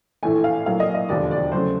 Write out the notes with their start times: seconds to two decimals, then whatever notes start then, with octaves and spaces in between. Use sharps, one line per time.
0.23 A#1 A2 E3 A3 G#5
0.44 F5
0.66 A#1 A2 F#3 A#3 F5
0.80 D#5
0.95 D#5
1.09 E1 D#2 D3 F3 D5
1.31 D5
1.52 C#3 F#3 A3 C5